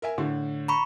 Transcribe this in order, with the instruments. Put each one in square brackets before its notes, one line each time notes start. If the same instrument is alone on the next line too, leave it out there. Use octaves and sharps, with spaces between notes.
[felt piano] A#4 E5 G#5
A2 D3
[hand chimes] A#5 B5 C#6